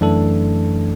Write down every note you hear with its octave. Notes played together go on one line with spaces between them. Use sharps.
F#2 E3 A3 D4 A4